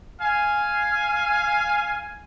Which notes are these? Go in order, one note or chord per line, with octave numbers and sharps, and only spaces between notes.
F5 G#5